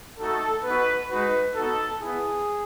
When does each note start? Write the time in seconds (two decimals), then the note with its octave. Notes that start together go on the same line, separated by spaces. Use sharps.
0.19 A3 D#4 F#4 A4
0.65 B3 D#4 F#4 B4
1.10 G#3 D#4 F#4 B4
1.56 B3 D#4 F#4 A4
2.01 B3 E4 G#4